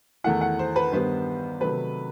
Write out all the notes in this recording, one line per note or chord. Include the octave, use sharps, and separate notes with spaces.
E2 D#3 A3 E4 F#5
F#5
C5
B4
G2 D#3 G3 B3 C5
C3 D#3 F#3 A3 B4